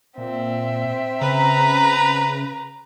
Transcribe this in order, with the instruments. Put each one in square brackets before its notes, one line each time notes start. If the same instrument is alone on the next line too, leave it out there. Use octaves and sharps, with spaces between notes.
[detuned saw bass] A#2 [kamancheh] C4 E5
[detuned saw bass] C#3 [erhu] B4 [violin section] A#5